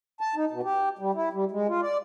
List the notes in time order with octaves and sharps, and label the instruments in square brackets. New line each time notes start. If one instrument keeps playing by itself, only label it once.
[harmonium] A5
D#4
B2
G4
G3
E4
G3
G#3
F4
D5